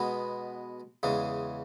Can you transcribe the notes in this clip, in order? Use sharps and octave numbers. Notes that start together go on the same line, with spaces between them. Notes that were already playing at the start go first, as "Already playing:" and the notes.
Already playing: B2 G#3 B3
E2 C#3 G#3